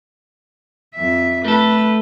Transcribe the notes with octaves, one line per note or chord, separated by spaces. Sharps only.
F2 E5
A3 A4 B4